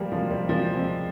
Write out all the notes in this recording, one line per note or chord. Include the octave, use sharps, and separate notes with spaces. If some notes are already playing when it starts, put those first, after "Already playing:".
Already playing: F3 G3 G#3 A#3
F3 G#3
G3 A#3
F3 G#3
G#3 C4